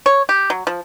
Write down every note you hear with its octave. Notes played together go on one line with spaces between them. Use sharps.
C#5
G4
F#3
F3